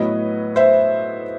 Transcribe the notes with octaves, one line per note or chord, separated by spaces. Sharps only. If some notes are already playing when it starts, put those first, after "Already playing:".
Already playing: A2 F#3 B3 B4 D#5
C5 E5